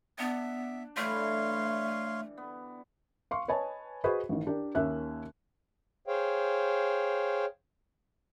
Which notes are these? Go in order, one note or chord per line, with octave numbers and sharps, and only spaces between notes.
B3 D4 E5
D3 E3 G3 A3 C#5 F5 C6
B3
F5 C6 C#6
B4 C#5 D#5 G#5 A5
F#4 G#4 B4 C5 D#5
A1 D#3
D4 G4 A#4
D#2 A#3 C#4 E5 F#6
G#4 C5 C#5 F5 G5